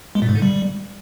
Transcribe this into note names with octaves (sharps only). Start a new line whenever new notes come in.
G#3
A#2
G#2
D3
G3